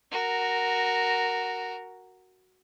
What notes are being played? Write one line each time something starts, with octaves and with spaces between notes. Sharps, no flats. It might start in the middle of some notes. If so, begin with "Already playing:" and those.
F#4 A#4